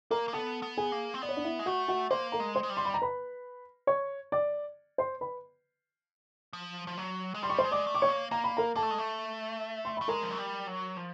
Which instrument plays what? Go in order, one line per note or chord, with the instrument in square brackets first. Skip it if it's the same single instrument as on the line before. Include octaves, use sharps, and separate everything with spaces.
[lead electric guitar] A#3 [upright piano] A#4 A#5
[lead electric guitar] A#3
[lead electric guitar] B3 [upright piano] A4 A5
[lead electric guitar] B3
[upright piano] G#4 G#5
[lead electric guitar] A#3
C4
[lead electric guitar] B3 [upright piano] D5
[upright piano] C#5
D4 D5
E4 E5
[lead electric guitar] G#3
[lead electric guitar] A3 [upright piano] F#4 F#5
[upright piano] F#4 F#5
[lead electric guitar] A#3 [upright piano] C5 C6
[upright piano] A#4 A#5
[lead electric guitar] G#3
[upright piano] C5 C6
[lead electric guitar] G#3
G3
[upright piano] C6
B5
A#5
B4 B5
C#5 C#6
D5 D6
C5 C6
B4 B5
[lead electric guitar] F3
F3
F#3
G#3
[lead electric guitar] G3 [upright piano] C6
[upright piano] C#6
C5 C6
[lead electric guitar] G#3
[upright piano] D5 D6
[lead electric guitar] A3
[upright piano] D6
C#5 C#6
[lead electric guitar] A#3
[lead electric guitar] A#3 [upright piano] A#5
[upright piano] B5
A#4 A#5
[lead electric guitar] A#3 [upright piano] A4 A5
[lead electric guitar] A3
G#3
A3
[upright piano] C6
[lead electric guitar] A3 [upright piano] B5
[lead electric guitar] G#3 [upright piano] A#4 A#5
[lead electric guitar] F3
F#3
G3
F#3
F3